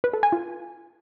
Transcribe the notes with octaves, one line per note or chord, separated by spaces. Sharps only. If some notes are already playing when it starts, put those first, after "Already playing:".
B4
A4
G#5
F4